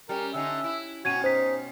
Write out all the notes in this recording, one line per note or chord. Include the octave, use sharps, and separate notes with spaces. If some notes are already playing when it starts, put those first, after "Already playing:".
G3 C#4 A#4
D3 C#4 D#4 E5
E4
G#2 B2 C#4 F#4 G#6 D#7
D#4 C5 B6